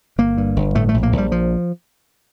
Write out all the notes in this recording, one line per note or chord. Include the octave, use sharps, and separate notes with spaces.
G1 A#3
G2
G1
A2 A3
A3
A#1
A#3
A#1
G3
F3